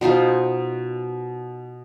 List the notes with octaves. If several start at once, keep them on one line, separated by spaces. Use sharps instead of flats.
B2 D#4 F4 C5